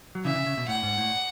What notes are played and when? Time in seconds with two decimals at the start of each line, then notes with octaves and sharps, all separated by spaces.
0.15 F#3
0.25 C#3 E3 E5
0.35 C#3
0.46 C#3
0.57 B2
0.68 A2 F#5
0.83 G#2
0.97 A2